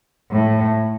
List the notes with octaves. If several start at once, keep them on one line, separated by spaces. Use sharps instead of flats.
A2